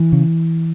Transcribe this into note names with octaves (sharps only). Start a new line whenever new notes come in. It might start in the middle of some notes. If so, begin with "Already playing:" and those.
Already playing: E3
C#3